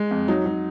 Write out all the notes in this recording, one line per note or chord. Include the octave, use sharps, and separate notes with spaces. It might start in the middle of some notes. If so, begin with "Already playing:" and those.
Already playing: G#3
F2
F#3 D#4
F#3